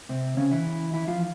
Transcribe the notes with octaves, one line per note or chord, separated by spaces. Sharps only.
C3 C4
C#3 C#4
E3 E4
E3 E4
F3 F4